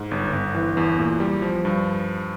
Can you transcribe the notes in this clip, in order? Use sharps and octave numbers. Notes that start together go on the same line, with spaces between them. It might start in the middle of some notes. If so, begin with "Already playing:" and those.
Already playing: G#2
G1
G1
E3
E2
A#2
G3
F3
G2